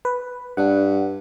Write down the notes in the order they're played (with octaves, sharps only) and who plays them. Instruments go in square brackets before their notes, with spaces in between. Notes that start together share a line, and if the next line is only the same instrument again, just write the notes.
[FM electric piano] B4
[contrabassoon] G2 [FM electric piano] D4 F#5